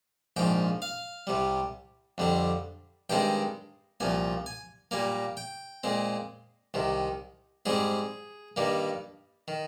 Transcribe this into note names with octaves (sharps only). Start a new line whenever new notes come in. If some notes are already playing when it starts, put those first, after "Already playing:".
A#1 G#2 F3 G5
F5
C2 C3 G3
F2 D3 G3 C4
G2 D#3 G#3 C4 G5
C2 A#2 F3 G#5
G#5
A#2 G3 A#3 G#5
G5
A#2 G#3 C4
C2 C3 D#3
G#2 G3 C4 G#4
G2 D#3 G3 A#3
D#3